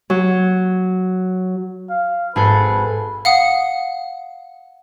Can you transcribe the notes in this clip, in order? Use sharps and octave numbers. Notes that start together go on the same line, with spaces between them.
F#3
F5
G#1 G#4 A4 B4
F5 F#5 D#6